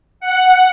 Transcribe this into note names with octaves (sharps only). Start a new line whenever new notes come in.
F#5